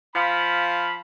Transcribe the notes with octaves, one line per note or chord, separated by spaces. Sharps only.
F3 F5 B5